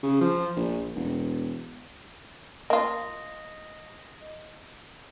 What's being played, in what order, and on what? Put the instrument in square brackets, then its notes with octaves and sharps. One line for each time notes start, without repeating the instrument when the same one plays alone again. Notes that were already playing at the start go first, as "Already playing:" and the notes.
[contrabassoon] C#3
F3
A#1
E1
[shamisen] A#3 F4 [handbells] D#5